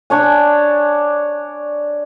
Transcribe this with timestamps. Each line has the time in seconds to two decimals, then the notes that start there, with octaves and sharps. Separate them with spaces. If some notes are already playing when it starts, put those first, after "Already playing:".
0.10 D4 C#5 G#5